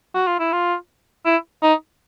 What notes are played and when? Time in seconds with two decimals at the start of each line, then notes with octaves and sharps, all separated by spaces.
0.14 F#4
0.27 F4
0.39 E4
0.52 F4
1.25 E4
1.62 D#4